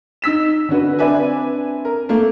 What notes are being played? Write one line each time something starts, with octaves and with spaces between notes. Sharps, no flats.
D#4 E6 B6 E7
D3 C#4 F#4 B4
C4 D4 B4 D5 E5 G#5
A#4
A3 A#3